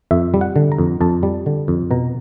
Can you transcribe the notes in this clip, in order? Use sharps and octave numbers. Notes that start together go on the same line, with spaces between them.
F2 E5
G3
F#5
D3
A#5
F2
F2 A5
G3
D3
F2
B2 A#5